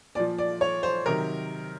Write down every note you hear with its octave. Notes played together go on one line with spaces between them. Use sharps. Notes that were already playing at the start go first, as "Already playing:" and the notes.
A#2 F3 D5
D5
C#5
C5
C3 D#3 F#3 A#4